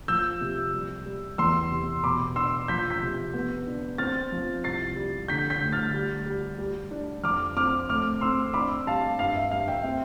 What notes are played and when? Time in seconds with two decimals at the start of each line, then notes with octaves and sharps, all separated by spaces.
0.08 F3 E6 G6
0.41 C3
0.74 G3
1.06 G3
1.38 E2 C6 E6
1.72 C3
2.04 B2 B5 D6
2.36 D4 C6 E6
2.68 F3 G6 B6
2.90 G6 B6
3.02 C3
3.34 B3
3.67 D4
3.98 C4 F6 A6
4.32 F3
4.64 C2 A6 C7
4.96 G3
5.28 D3 G6 B6
5.50 G6 B6
5.62 D2
5.72 F6 A6
5.94 G3
6.26 G3
6.59 G3
6.91 D4
7.24 F2 D6 F6
7.56 C4 D6 F6
7.89 A3 D6 F6
8.21 C4 C6 E6
8.54 D4 B5 D6
8.87 G3 F5 A5
9.19 G2 F5
9.36 E5
9.51 G2 F5
9.68 E5 G5
9.84 C4